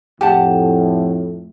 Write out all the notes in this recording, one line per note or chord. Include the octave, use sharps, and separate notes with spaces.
F2 A2 G4 F#5 A5